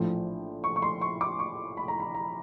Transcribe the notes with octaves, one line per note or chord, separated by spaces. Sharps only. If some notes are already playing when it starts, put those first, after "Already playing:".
Already playing: A#1 A2 F3
C#6
C#6
C6
C#6
D6
C#6
B5
A#5
B5
A#5